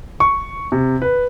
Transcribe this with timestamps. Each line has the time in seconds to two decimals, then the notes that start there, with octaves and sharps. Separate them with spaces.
0.20 C#6
0.72 C3
1.02 B4